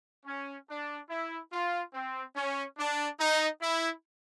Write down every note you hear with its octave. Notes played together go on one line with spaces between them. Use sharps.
C#4
D4
E4
F4
C4
C#4
D4
D#4
E4